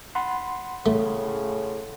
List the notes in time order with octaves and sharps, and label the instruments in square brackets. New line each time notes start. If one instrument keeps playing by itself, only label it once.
[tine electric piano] F#5 B5 C6
[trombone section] A2 C#3 [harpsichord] A3